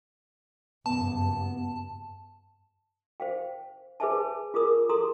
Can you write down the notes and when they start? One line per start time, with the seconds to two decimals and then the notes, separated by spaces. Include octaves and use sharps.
0.86 F#1 G2 B3 A5
3.20 C5 F5 G5
4.00 G#4 B4 C5 E5 G#5 A5
4.54 F4 G#4 A#4 D#6
4.89 A4 A#5 C6 D#6